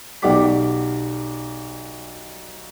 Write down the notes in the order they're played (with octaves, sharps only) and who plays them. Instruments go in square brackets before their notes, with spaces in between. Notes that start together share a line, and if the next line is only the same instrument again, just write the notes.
[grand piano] B1 G4 D5 F#5 D6 B6